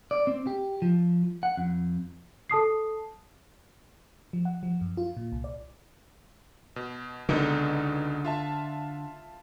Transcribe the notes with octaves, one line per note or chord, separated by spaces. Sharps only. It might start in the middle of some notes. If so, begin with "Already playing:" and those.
D5
C4
G4
F3
F#5
F2
A4 A5 D#6 C7
F3
F#5
F3
F#2
F4
A#2
C2
D5
B2
C#2 B2 D3 D#4
F4 E5 A5